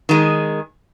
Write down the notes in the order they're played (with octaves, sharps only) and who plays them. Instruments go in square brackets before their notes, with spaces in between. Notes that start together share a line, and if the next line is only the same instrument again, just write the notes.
[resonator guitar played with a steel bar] D#3 G#3